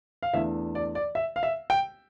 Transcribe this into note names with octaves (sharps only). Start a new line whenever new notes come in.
F5
E2 E3 A3 D4 E5
D5
D5
E5
F5
E5
G5